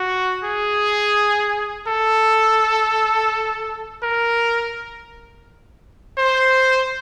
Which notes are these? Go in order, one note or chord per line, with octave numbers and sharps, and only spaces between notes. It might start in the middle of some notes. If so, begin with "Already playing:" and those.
Already playing: F#4
G#4
A4
A#4
C5